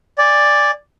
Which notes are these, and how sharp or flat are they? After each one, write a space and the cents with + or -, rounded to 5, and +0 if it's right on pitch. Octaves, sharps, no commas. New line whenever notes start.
D5 +0 G#5 -25